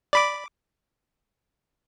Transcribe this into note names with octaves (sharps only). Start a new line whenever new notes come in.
D5 B5 D6